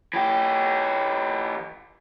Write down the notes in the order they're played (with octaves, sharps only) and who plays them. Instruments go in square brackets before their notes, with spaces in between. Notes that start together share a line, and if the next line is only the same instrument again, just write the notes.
[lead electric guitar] E3 G4